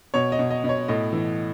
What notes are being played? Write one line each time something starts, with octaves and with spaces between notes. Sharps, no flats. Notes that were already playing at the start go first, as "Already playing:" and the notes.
B2 C#5
D#5
B2
D#5
B2
C#5
A2 D#5
E3